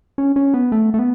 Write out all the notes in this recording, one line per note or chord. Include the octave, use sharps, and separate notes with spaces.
C#4
C#4
B3
A3
A3
B3